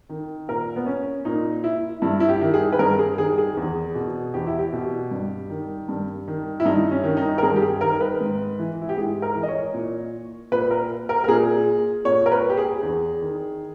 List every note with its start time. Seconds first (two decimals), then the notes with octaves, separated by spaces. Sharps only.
0.09 D#3
0.48 A#2 A#4
0.76 B3
0.86 C#4
1.25 A#2 D#4
1.64 E4
2.02 G2 E4
2.20 E4
2.29 G4
2.41 D#3
2.54 G#4
2.73 B4
2.79 G2 A#4
2.99 G#4
3.18 D#3 G#4
3.38 G#4
3.57 E2
3.95 B2
4.34 E2 G4
4.47 E4
4.58 G4
4.73 B2
5.11 G2
5.50 D#3
5.89 G2
6.28 D#3
6.60 E4
6.65 G2 D#4
6.91 C#4
7.04 D#3
7.17 D#4
7.38 A#4
7.42 G2 G#4
7.56 G4
7.62 G#4
7.81 D#3 A#4
8.01 B4
8.20 G#2
8.59 E3
8.81 E4
8.89 G4
8.97 G#2 G#4
9.22 A#4
9.35 E3
9.43 D#5
9.48 C#5
9.74 A#2
10.52 A#2 B4
10.70 A#4
11.09 A#4
11.24 A#4
11.28 A#2 G#4
12.05 A#2 C#5
12.26 A#4
12.31 B4
12.50 G4
12.57 G#4
12.83 E2
13.22 D#3